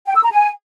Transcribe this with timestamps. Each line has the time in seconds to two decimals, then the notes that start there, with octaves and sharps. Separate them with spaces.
0.07 G5
0.16 E6
0.24 A#5
0.32 G#5